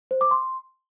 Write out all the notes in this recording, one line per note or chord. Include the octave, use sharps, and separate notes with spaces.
C5
D6
C6